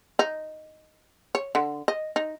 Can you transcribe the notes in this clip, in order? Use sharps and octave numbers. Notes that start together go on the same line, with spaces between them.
D#4
C#5
D3
D#5
D#4